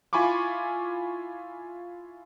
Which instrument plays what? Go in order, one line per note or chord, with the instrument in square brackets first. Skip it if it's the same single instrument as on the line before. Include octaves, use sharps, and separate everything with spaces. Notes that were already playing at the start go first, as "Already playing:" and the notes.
[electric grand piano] E4 F4 G#5 B5 C#6 D6